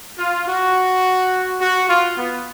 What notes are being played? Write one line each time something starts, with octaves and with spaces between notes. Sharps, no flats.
F4
F#4
F#4
F4
B3